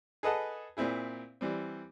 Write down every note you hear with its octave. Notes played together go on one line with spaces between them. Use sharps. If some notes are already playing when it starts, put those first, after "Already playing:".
G#4 A4 B4 D#5 F#5 A5
A#2 C4 E4 G#4
E3 G3 C4